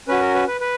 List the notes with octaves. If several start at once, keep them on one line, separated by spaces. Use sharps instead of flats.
C#4 F#4 B4
A#4
B4
B4
B4